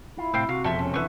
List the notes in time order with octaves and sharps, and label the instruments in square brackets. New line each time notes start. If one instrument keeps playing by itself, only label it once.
[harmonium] E4 [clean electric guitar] F4
[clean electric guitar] A2 C3 [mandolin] C5 F5 G5 [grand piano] E6
[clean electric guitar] C3 [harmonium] F#4 [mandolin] F5
[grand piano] E1 F2 [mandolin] A4 E5 C6
[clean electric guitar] C3 [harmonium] C#4 [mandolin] A4
[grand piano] D3 E3 E5 [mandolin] B4 C#6